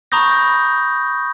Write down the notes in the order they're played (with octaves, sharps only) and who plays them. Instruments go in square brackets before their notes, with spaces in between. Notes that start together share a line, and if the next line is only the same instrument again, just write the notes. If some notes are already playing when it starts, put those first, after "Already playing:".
[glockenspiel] A#5 B5 C#6 D#6 G6 A#6